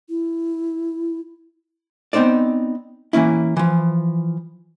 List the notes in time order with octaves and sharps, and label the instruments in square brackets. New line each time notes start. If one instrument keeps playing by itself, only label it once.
[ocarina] E4
[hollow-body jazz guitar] B3 C4 D#4 C5 D5
E3 A#3 C#4 E4
E3 F3